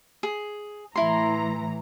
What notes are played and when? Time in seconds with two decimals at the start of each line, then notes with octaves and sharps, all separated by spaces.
0.23 G#4
0.96 A2 E3 E4 A#5 C6